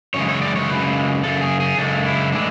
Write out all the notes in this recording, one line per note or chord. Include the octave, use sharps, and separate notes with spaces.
F#2 C#3 E3 G#3 C#5
C#5
D5
C#5
F#2 C#3 G#3 B4
F#2 C#3 A4
G#4
G#4
F#2 C#3 G#3 A4
E4
A2 E3 G#3 D4